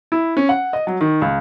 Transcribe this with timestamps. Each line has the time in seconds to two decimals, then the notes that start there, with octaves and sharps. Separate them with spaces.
0.12 E4
0.37 C#4
0.49 F#5
0.73 D#5
0.87 F#3
1.01 D#3
1.22 C#2